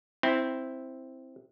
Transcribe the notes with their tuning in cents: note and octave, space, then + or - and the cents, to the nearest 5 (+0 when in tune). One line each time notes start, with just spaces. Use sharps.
C4 +0 E4 -5